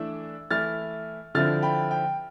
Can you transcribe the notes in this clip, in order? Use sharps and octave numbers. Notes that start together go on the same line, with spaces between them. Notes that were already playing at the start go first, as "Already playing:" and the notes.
Already playing: E3 A3 D4 E6
E3 A3 E4 F6 A6
D3 F3 C4 E4 F6 A6
G5 B5
G5